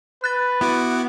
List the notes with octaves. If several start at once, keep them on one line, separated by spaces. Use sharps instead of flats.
B4 F#6 A6
B3 E4 F#4 D6